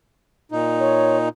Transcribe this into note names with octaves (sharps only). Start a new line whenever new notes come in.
A#2 D#4
C#5